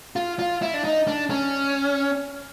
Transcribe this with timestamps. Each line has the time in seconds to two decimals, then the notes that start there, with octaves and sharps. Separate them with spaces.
0.16 F4
0.39 F4
0.62 E4
0.74 D4
0.84 D#4
1.08 D4
1.30 C#4